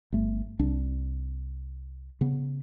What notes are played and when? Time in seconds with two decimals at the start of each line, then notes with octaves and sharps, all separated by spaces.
0.12 G1 A3
0.59 C2 D4
2.21 C#3 B3